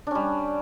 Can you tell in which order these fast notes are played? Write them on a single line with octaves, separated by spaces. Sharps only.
D4 C#4 G3